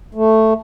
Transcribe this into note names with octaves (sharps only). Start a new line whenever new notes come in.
A3